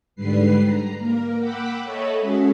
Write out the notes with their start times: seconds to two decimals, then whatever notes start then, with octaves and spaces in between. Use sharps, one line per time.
0.15 G#2 D3 G3 B4 C7
0.64 A#5
0.98 A#3 A#4
1.38 F#5 G5 B5 D6 E6 F#6
1.83 A4 C#5 D#5 E5 A5 B5
2.21 G#3 C#4 F#4 G#4